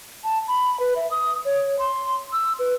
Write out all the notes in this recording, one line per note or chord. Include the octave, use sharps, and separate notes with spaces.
A5
B5
B4
E5
D#6
C#5
C6
E6
B4